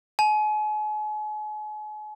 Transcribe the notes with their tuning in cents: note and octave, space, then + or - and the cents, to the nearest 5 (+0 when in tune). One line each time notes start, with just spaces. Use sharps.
G#5 +40